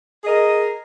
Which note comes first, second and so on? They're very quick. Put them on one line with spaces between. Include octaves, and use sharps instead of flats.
G#4 D#5 A#4